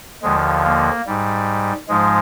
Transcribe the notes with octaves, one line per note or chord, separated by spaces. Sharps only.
D#2 D3 F3 G#3
A#3
G#2 G3
G#2 F3 G#3